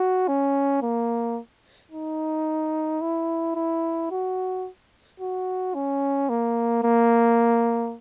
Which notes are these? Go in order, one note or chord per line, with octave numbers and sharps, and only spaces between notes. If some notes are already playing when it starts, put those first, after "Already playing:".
Already playing: F#4
C#4
A#3
D#4
E4
E4
F#4
F#4
C#4
A#3
A#3